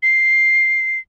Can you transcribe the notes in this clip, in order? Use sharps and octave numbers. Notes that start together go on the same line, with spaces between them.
C7